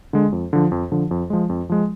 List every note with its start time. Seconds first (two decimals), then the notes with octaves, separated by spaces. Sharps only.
0.13 D3 G#3
0.32 F2
0.53 D3 F3
0.72 F2
0.92 D3 F3
1.11 F2
1.30 F3 G#3
1.49 F2
1.69 F3 G#3